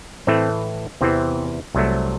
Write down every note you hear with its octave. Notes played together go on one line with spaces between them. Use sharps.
A2 E3 A3 C4
E2 C3 E3 C4
C2 C3 F#3 A3